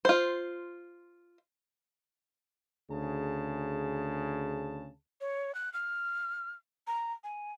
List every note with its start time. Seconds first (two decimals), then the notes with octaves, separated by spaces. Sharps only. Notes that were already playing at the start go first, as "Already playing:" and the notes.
0.05 F4 C5
2.89 D2 C#3 G#4 A5
5.21 C#5
5.55 F#6
5.73 F6
6.87 A#5
7.24 G#5